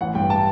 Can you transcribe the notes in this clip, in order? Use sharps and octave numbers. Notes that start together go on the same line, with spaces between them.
A1 F#5
G2 G5
A5